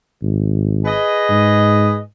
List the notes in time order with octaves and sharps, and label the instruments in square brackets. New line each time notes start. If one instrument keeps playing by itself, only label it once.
[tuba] G#1
[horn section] G#4 B4 D#5
[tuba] G#2